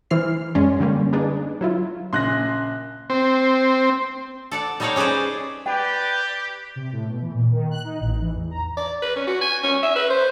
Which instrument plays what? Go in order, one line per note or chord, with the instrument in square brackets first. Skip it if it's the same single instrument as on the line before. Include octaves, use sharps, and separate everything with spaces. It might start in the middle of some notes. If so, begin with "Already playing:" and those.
[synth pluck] E3 E4 C5 F6 C7
F#2 G#3 C#4 D5 C6
D3 G3 A#3 C#4
D4 D#4 G#4 B4
F#3 E4 F4
[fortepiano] A#1 C#3 [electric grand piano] C6 F#6 A#6
[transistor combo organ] C4
[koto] A4 D5 F#5
G3 D#4 A4 C#5 D5 F5
C#4 G#4 B4 C5 D5
[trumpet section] G4 [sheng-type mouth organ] B4 D5 [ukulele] G5
[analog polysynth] C3
A2
B2
E3
A#2
D#3
F#6
D#4
A1
E3
E2
A#5
[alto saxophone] D5
B4
C#4
F#4
G#5
C#4
E5
B4
C5